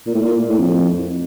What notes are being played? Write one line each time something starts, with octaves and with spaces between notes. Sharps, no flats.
A#2
A2
A#2
A2
F2